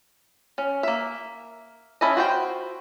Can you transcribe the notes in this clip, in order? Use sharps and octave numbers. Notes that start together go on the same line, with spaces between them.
C#4
A#3 E5
C#4 E4 A4 D#5
F4 F#4 C5 G5